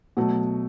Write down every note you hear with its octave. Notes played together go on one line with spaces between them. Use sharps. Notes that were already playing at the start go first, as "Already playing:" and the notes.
B2 F#3 A3